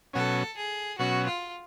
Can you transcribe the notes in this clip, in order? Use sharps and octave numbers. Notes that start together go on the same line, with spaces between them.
B2 F#3 C#4 A4
G#4
B2 F#3 C#4 F#4
F4